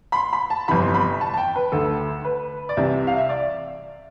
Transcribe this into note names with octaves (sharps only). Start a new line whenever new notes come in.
B5
C6
B5
A5
G1 F2 C3 E3 B5
C6
B5
A5
A5
G5
B4
D2 D3 A4
B4
D5
C2 C3 E3 E5
F5
E5
D5